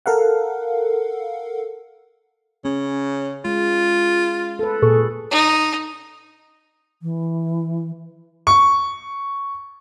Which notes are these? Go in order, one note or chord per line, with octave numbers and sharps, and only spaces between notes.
A4 A#4 F5 F#5
C#3 C#4
G#3 F4
A4 B4
A#2 G#4 A4 C#6
D#4
E3
C#6